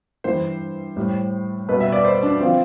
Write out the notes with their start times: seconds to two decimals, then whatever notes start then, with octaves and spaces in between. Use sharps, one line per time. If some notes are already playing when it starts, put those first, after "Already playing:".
0.24 G2 E3 G3 C5
0.96 A2 G3
1.69 B2 G3 B4
1.80 E5
1.92 D5
2.04 C5
2.23 D4
2.40 D3 F3 C4